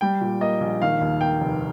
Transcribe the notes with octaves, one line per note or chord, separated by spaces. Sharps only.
G3 G5
A#2
A#3 D#5
A#1
D#3 F5
D#2
A#3 G5
F1